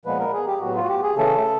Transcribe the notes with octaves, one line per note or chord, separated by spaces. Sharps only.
A#2 F3 G#3 B3 B4
A#4
G#4
G4
A2 F#3 B3 F#4
F4
F#4
G4
G#4
C#3 E3 A3 C#4 A4